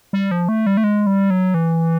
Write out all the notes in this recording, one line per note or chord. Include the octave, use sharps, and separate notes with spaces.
G3
F3
A3
G3
A3
G#3
G3
F#3
E3